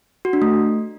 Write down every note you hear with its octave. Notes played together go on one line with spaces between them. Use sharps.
F#4
D4
A3